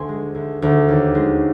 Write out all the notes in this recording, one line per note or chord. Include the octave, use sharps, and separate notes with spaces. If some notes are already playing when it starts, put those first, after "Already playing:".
Already playing: D2 G#5 C6
G#3
D2
D2
D#2
G#3